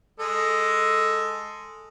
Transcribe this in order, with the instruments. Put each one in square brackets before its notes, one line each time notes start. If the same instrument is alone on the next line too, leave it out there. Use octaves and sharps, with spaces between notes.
[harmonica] G#3 A4